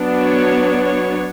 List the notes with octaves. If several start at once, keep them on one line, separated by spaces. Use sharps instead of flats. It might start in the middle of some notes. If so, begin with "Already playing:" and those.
Already playing: F#3 B3 D4
C#5
C#5